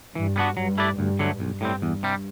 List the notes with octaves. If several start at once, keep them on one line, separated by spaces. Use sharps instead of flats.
G2 E3
G3 B3 D4 F#4
G2 F#3
A3 E4 B4 D5
D2 G2
D3 F#3 A3
B1 G2
A2 G3 C4
E2
C3 G3